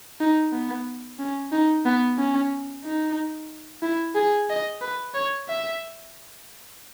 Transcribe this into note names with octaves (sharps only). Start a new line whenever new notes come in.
D#4
B3
C#4
D#4
B3
C#4
D#4
E4
G#4
D#5
B4
C#5
E5